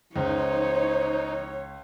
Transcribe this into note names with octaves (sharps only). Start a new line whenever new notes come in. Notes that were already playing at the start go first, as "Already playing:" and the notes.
C#2 D#4 C5 C#5